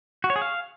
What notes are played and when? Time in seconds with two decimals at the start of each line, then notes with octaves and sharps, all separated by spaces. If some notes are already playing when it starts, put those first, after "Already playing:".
0.24 F#4
0.30 C#5
0.36 G#4
0.42 F5